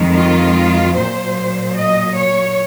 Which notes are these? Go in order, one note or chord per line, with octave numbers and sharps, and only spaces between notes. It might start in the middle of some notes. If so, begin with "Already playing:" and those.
Already playing: F2 D#3 G#3
F4
A#2 F#3 C5
D#5
C#5